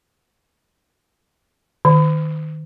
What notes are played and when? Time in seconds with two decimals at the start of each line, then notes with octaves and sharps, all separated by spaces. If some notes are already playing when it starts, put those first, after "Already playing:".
1.85 D#3